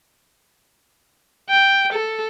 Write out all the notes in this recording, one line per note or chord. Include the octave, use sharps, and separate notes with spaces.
G5
A4